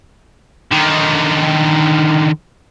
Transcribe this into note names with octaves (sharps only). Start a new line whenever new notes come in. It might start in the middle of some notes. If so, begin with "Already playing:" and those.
D3 D#3